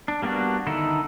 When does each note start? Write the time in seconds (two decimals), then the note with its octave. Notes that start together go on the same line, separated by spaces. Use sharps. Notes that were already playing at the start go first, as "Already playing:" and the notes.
0.08 D4
0.22 G3 A#3 B3 D4 F#4
0.66 D3 D#3 D#4 E4 A4